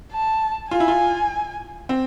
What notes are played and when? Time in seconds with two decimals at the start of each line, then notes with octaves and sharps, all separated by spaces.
0.12 A5
0.71 F4 G#5
0.80 E4
0.88 F4
1.89 C4